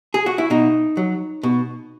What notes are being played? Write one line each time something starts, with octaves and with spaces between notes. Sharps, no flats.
G#4
F#4
E4
B2 D#4
F#3
B2